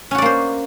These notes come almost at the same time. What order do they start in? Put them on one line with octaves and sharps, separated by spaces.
C#4 F#4 D5 A#3 C5